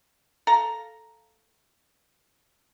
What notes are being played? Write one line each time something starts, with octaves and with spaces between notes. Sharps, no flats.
A4 F5 A#5